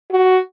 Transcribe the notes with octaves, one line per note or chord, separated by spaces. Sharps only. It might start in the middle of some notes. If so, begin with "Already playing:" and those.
F#4